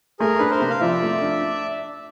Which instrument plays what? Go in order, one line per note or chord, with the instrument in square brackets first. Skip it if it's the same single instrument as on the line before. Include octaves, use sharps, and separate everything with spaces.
[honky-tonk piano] A3 [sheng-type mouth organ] G#4 A#4
[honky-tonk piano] D4 [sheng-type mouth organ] B4
[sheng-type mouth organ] A#4 C5
[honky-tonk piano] C3
[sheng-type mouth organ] F5
[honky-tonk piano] F3 [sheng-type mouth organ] D5 E5
[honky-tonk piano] A3
D4